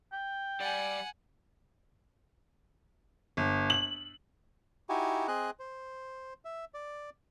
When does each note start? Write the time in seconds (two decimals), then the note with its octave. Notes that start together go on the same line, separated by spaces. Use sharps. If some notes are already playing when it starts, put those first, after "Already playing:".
0.12 G5
0.61 G3 D5 F#5 G#5
3.37 G1
3.70 F#7
4.89 D#4 E4 F#4 G4 G#5
5.28 C4 G#4 D#5 G#5 F#6
5.59 C5
6.45 E5
6.74 D5